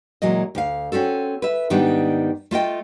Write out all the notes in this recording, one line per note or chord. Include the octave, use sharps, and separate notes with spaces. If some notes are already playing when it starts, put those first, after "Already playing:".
A#2 E3 F#3 G#3 D#5
D2 F5
C4 C#4 F#4 A4
B4 E5
G#2 D#3 G3 B3 D4
A3 F4 D#5 G5